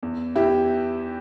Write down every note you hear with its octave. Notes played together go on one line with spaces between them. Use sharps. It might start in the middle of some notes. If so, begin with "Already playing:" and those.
E2
E2 E4 G4